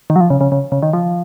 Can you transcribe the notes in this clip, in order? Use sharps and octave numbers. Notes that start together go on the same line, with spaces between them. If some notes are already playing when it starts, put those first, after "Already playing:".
D#3
F#3
F3
C#3
C#3
C#3
C#3
D#3
F3